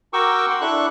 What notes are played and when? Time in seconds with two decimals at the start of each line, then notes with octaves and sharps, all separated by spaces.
0.13 F#4 A#4 G5 C#6 D6 E6
0.50 F#5 C6
0.61 D4 E4 A4 C#6 F#6